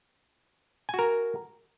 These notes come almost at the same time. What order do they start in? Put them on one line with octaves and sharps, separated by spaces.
G#5 F#4 A#4